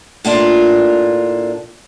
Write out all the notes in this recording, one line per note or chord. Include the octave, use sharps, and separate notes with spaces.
A2 A#3 D4 F4